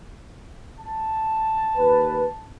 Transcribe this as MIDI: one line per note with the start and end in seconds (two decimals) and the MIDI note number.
0.79 2.49 81
1.78 2.25 39
1.78 2.25 71